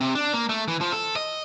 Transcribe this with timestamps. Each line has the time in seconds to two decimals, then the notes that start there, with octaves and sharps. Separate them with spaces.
0.01 C3
0.15 D4
0.33 A#3
0.49 A3
0.68 E3
0.81 F3
0.92 A4
1.16 D#5